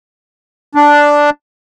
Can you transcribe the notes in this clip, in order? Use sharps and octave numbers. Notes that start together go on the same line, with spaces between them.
D4